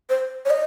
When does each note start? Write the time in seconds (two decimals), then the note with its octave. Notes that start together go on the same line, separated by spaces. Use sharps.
0.10 C5
0.45 C#5
0.50 D#5